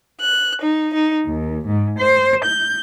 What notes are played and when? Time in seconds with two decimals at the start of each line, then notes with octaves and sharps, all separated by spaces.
0.21 F#6
0.61 D#4
0.94 D#4
1.26 D#2
1.66 G#2
1.99 C5
2.46 G6